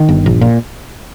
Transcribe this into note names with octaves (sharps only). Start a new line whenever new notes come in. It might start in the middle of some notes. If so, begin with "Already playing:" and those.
Already playing: D#3
G1
A#1
A#2